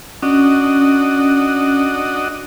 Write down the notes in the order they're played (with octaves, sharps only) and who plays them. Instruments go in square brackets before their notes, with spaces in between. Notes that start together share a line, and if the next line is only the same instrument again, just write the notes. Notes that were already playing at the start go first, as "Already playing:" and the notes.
[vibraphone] C#4 [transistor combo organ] D4 F#4 D#5